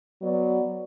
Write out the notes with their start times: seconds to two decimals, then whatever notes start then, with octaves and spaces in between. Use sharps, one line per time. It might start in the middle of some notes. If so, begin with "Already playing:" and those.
0.22 F#3 B3 D5